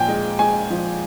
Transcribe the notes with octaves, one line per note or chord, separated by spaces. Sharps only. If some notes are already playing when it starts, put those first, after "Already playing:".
Already playing: A#2 F3 G5 G#5
G#3
G#3 G#5
F3